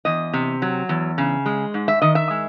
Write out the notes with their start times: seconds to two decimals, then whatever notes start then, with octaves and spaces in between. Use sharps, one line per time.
0.05 E2 D#5
0.33 C3
0.62 F#3
0.89 E2
1.18 C#3
1.46 G#3
1.74 G#2
1.88 E5
2.02 D#3 D#5
2.15 E5
2.30 G#3